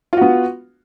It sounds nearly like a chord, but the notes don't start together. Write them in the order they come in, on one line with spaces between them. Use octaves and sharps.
F4 F#4 B3